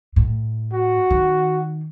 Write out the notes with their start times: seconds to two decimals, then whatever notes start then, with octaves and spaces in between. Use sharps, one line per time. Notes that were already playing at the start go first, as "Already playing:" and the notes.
0.16 A2
0.73 F#4
1.10 D#3